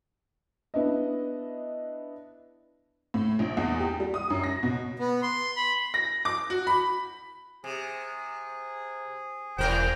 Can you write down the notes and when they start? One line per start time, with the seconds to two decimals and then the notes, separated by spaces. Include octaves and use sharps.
0.74 B3 D4 E4 D#5
3.14 A2
3.39 A#1
3.57 E2
3.80 G4
4.00 G3
4.14 D#6
4.30 F#2
4.44 A#6
4.63 B2
4.99 B3
5.23 C6
5.56 B5
5.94 A#6
6.25 D6
6.50 F#4
6.67 B5
7.64 C3 G#4
9.58 E1 A2 A#4 C5 G5